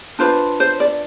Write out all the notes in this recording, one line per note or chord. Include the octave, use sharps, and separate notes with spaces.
D4 F4 B4 C5
C5
D5